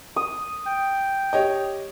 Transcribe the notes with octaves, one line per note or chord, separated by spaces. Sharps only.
D#6
G5
G4 C#5 D#5